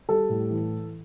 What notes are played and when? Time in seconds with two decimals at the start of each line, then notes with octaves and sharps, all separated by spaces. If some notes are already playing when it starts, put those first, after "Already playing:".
0.09 G3 A4
0.29 A2
0.51 E3